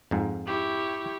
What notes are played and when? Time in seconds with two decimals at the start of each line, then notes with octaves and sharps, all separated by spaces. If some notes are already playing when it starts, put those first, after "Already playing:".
0.11 F2 G#2
0.46 E4 G4 C#6